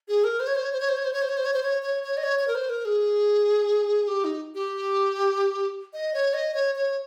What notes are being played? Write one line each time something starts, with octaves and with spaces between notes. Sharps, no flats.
G#4
A#4
C5
C#5
C5
C#5
C5
C#5
C5
C#5
C5
C#5
C5
C#5
C5
C#5
C5
C#5
C#5
C#5
D#5
C#5
C#5
A#4
C5
A#4
G#4
G4
D#4
G4
D#5
C#5
D#5
C#5
C#5